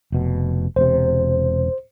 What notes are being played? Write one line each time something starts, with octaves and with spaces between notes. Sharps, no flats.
F1 B2
E1 C3 C5